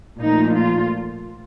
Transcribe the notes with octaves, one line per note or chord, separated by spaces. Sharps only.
A#2 F3 A3 D#4
F4